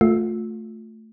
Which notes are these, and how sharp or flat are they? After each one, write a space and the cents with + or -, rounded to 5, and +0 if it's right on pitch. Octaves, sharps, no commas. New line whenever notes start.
A3 +0 F4 +25